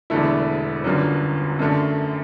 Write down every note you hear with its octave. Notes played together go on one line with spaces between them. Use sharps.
E1 E2 D3 A3 E4
G1 F#2 D3 F#3
F#2 D3 A3